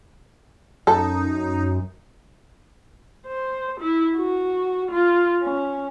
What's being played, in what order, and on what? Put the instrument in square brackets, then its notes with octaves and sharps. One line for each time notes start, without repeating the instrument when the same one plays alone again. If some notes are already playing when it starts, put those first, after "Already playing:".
[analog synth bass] F#2 [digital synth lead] D#4 [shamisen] A4
[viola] C5
E4
F#4
F4
C#4